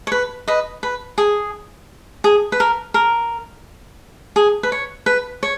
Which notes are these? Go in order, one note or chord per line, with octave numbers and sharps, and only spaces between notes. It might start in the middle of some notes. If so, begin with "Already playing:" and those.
C#5
B4
B4 D#5
B4
G#4
G#4
B4
A#4
A#4
G#4
B4
C#5
B4
C#5